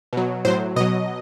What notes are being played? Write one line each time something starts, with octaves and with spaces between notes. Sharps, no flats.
B2 F#3
A2 F#3 C5
B2 F#3 D#5